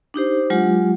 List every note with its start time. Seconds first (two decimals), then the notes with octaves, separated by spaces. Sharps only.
0.14 D4 D#4 G4 C5
0.50 F#3 G#3 F4 G4 F#5